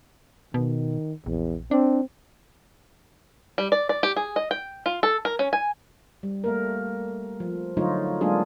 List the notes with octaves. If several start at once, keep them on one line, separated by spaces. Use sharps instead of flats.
B2 D#3
A#1 E2
C4 D4
G3
D5
D5
G4
G#4
D#5
G5
F4
A4
A#4
C#4
G#5
G3
A3 A#3 A#4
F3
D3 F#3 A3 D#4 F4 C#5
F#3 G#3 A#3 D4 F4 G#4